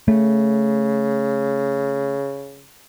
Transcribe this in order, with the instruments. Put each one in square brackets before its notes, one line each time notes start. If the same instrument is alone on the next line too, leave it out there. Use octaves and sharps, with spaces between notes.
[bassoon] C#3 [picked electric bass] A3